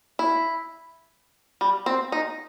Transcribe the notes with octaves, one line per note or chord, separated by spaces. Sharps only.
E4
G3
C4
D#4